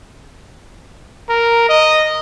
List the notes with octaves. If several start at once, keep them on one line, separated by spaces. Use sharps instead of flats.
A#4
D#5